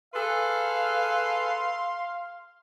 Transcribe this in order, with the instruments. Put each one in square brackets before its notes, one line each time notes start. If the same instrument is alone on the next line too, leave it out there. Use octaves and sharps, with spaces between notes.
[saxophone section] G#4 A4 B4 [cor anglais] F5 [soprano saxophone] C6